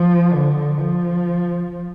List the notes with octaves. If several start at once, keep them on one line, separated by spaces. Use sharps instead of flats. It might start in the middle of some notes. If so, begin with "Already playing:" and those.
Already playing: F3
D3
F3